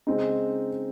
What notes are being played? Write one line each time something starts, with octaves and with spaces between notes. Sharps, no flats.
C#3 G#3 C4 D#4